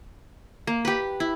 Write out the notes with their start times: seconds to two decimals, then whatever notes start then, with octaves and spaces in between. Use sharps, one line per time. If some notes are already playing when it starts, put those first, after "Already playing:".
0.67 A#3
0.85 G4 B4
1.20 E4